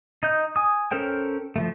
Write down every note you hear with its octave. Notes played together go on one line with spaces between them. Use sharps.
D#4 D#5 G6
G#5 D#6
C#4 A4 A#4 C5 G5
F3 G3 A3